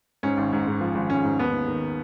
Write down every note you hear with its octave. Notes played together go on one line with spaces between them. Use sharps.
G#2 C#4
G#1
G#2
G#2
F3
G#1
G#1 C#4
G#2
D#2 B3
D#2
D#3